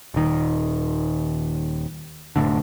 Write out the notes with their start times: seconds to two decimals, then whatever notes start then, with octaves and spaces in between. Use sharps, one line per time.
0.14 D#1 D#3
2.36 F1 B1 A2 D3